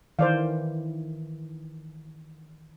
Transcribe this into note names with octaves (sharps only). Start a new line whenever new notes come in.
D#3 E3 C5 D5 F5